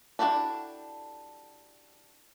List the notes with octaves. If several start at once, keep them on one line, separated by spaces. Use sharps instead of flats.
D4 E4 F#4 G4 A4